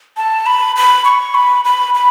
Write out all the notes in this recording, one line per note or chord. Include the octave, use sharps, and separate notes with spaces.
A5
B5
B5
C#6
B5
B5
B5